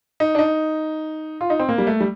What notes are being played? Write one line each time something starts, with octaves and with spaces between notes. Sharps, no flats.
D#4
D4
D#4
F4
D#4
C4
A#3
G3
A3
G3